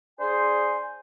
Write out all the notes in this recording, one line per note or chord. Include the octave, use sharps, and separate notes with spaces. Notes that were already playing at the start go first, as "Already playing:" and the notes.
D4 G#4 C5 G#5